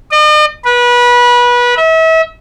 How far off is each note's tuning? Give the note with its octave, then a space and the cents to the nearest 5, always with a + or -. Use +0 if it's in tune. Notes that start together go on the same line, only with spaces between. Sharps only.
D#5 -45
B4 -25
E5 -35